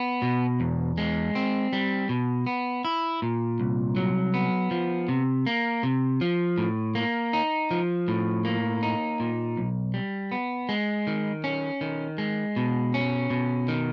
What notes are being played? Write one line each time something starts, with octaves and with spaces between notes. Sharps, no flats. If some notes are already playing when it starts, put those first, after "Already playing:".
Already playing: B3
B2
E2
G#3
C4
G3
B2
B3
E4
A#2
C2
F#3
B3
F3
C3
A#3
C3
F3
A2
A#3
D#4
F3
A2
A#3
D#4
A#2
B1
G3
B3
G#3
D#3
C#4
D#3
G#3
B2
C#4
B2
D#3